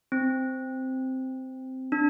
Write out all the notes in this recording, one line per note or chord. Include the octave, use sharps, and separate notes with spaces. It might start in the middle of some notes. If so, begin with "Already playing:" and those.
C4
D4